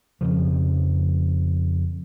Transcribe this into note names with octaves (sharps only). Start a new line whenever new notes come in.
F2 C#3 F3